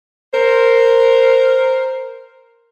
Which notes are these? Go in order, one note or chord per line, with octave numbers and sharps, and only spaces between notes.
A#4 C5